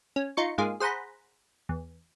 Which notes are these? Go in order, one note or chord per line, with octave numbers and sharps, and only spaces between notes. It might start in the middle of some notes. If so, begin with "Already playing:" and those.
C#4
D#4 F4 C#6 C#7
G#2 A#3 F4 G#4
G#4 C5 F#5 A#5 B5
E2